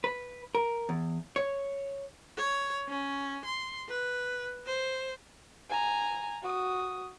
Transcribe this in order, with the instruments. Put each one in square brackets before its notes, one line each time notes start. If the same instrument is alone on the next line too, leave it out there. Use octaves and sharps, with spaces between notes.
[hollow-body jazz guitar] B4
A#4
E2
C#5
[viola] C#5
C#4
C6
B4
C5
[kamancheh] G#5 A#5
F#4 D#6